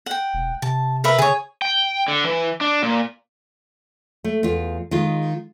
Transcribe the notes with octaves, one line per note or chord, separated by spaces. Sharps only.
F#5 G5
E1
C3 A5
A#4 B4 E5
C#3 G#4 C#5
G5
D3
E3
D4
A#2
A3
E2 F4
D#3 G#3 F4